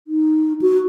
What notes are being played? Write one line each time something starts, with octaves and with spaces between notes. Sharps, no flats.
D#4
F#4